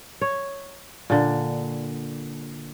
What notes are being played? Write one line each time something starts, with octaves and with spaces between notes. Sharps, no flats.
C#5
A#2 D3